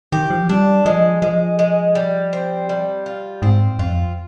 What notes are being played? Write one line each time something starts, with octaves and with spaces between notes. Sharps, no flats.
D#3 G4
F3
G3 D4
F3 G#3
F3 G#3
G#3
G3
C4
G3
F4
G#2 C4
F2 F4